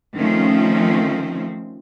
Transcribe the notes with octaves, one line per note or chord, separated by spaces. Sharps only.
D#3 F3 A3 C4 C#4